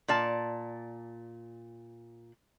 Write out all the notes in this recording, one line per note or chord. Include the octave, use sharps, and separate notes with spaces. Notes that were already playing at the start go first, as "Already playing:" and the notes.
A#2 D5 A5